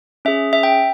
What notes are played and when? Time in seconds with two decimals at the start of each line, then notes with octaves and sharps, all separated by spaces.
0.25 C#4 G#4 E5
0.53 E5
0.63 G5